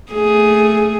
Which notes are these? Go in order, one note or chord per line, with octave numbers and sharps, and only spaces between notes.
A3 G#4